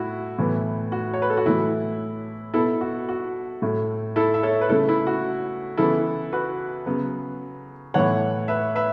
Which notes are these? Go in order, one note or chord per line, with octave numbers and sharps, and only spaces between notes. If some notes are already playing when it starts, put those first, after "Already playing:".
Already playing: A2 E4 F#4
A2 E3 B3
F#4
C#5
B4
A4
F#4
A2 E3 A3 E4
B2 B3 E4 A4
F#4
F#4
A2 A3
E4 A4
E5
A4 C#5
B4
C#3 A3 E4 A4
E4
F#4
C#3 E3 B3 E4 A4
F#4 B4
C#3 F#3 B3
A2 E3 B3 C#5 F#5
B4 E5
B4 E5